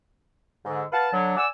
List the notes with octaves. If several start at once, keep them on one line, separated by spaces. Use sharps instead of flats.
G#2 D3
B4 F5 F#5 A5
D3 F#3
D5 F#5 G#5 E6